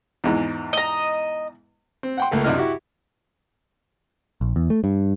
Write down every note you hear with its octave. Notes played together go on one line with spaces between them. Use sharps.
E2 G#2 E3
D#5 A#5
C4
F#5 G5 C6
C#2 A3 A#3
F#2 C3 D4 E4 D#5 F6
E4 F#4 G4
A#1
E2
A3
G2